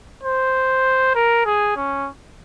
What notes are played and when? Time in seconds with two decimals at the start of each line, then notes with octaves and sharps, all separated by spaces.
0.23 C5
1.15 A#4
1.46 G#4
1.76 C#4